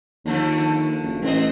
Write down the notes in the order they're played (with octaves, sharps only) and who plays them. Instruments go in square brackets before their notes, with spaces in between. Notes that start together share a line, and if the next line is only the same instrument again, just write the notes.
[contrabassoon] D#2 [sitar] D3 F3 A3
[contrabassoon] F#1
[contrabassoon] A1 [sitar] B2 C4 D#5